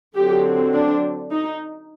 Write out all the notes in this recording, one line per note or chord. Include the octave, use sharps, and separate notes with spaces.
D3 F#3 C4 G4
D4
D#4